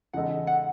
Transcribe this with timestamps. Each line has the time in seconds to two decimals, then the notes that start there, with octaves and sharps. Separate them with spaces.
0.13 E2 C#3 G#3 D#4 A4 F#5
0.47 F#5